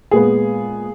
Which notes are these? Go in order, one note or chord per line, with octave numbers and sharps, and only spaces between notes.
A#2 G#3 B3 G#4